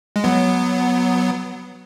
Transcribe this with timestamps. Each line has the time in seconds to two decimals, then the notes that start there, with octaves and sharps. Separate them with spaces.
0.16 G#3
0.24 F#3 B3